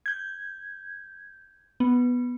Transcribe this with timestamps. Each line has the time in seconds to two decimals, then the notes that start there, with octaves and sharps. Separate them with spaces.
0.06 G6 G#6
1.80 B3